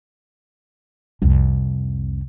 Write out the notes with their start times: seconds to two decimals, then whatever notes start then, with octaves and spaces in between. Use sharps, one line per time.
1.22 C2 F2